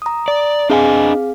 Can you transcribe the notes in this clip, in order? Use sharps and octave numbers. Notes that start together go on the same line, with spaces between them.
A#5 D#6
D5
C4 D4 G#4 D#5 F5 G#5